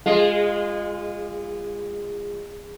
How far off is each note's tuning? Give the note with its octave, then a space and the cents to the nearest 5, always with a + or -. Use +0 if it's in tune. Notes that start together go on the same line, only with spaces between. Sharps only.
G#3 -25 F4 +0